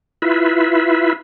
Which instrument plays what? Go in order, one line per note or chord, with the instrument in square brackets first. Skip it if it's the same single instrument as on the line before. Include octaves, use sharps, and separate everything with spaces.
[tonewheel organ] E4 F4 B4 E5